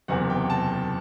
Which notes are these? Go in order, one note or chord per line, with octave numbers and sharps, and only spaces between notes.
F#1 E2 C3 F#5
G5
A5